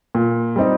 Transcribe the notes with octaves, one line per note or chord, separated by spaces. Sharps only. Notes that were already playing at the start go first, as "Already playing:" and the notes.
A#2
G3 C4 D#4 G4